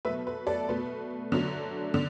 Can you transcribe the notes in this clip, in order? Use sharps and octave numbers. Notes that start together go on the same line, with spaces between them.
B2 F#3 A3 B4 E5
B4
A4 D5
B2 A3 B4
D3 F#3 A3
D3